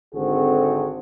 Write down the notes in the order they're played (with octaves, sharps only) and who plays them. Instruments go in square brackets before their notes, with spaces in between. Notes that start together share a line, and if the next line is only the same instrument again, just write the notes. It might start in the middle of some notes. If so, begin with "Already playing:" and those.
[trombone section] G#1 D3 C4 F#4 G#4 A4